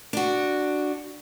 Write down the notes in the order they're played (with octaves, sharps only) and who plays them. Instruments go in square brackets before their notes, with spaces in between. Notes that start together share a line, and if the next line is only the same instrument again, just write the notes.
[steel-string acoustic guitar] D4 F#4